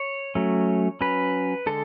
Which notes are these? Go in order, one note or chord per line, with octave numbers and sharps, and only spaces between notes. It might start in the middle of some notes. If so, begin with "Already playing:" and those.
Already playing: C#5
F#3 A3 C#4
F#3 C#4 B4
D3 G#3 A4